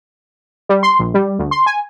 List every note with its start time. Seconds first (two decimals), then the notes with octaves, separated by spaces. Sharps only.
0.69 G3
0.83 C6
0.99 A#1
1.14 G3
1.39 D2
1.51 C6
1.66 G#5